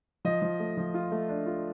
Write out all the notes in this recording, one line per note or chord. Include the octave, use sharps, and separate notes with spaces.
F3 D#5
F3
A3
F3
F4
A3
D4
F4